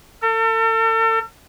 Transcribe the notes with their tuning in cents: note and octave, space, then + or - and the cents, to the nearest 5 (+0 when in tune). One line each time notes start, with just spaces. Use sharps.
A4 +40